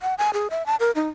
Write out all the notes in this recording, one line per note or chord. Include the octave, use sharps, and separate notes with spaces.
F#5
G#5
G#4
E5
A5
A#4
D#4